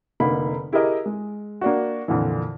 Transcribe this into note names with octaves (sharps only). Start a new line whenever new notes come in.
F1 D3 A#3 D#4 B5
E4 G4 G#4 A#4 D#5
G#3
A#3 D4 F#4
F2 A#2 D3 E3